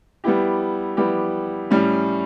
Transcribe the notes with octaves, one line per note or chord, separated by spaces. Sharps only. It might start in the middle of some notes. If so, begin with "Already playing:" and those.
G3 B3 E4 G4
G3 B3 E4 G4
A2 G3 C#4